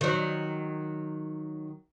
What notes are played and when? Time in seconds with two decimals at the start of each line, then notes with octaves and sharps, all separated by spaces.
0.01 D#3 F#3